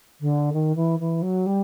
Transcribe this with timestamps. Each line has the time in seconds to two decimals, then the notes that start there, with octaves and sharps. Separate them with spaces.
0.20 D3
0.52 D#3
0.75 E3
0.99 E3
1.22 F#3
1.46 G3